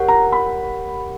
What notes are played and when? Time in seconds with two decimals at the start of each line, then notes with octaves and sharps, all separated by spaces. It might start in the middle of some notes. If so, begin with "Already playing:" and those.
Already playing: G4 A#4 C#5 F#5
0.08 A#5
0.32 B5